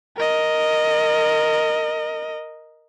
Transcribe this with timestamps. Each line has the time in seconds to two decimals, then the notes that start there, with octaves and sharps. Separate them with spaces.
0.17 A#4 D#5